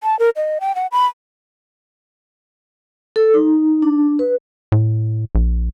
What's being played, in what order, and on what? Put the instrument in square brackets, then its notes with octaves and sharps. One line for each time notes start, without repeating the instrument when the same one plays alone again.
[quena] A5
A#4
D#5
G5
F#5
B5
[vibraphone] A4
D#4
D4
B4
[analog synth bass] A2
A#1